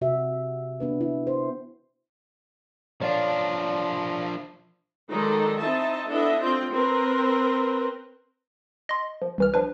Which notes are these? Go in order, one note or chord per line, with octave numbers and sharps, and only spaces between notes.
C3 F#4 E5
B3 D4 B4
E4
C5
F3 D4 C#5 D5 F5
D#3 F#3 G#3 D#4 A4 D5
C4 D#4 E4 D#5 E5 A5
B3 D4 E4 A4 D#5 E5
C4 F4 G5
C4 A#4 B4
D#5 C6
F3
C2 E3 F6
F3 D4 B4